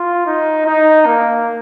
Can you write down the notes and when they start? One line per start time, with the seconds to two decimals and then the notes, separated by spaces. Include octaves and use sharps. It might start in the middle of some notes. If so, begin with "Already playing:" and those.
Already playing: F4
0.26 D#4
0.66 D#4
1.06 A#3